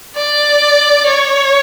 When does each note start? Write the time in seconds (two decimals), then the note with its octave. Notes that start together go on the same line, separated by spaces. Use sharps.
0.16 D5
1.08 C#5